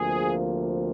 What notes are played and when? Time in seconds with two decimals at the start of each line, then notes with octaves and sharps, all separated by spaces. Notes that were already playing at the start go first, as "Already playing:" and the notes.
Already playing: D2 C3 F3 A#3 G#4